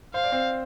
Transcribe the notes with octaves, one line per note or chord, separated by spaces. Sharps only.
C5 F5
D5
C4 C5